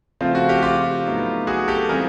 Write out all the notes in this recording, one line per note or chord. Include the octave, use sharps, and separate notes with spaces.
C#3 F3 A3 C4 F4
F#4
F4 G4
F4 G4
A2 F#3 B3 D#4
F#4 G#4
G4 A4
E3 G3 C4 F4 G#4 A#4